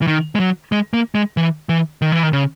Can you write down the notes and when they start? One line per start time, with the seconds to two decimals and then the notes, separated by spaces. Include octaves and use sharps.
0.02 E3
0.07 D#3
0.35 G#3
0.40 F#3
0.72 G#3
0.94 A#3
1.15 G#3
1.37 E3
1.69 E3
2.02 D#3
2.12 E3
2.23 D#3
2.33 C#3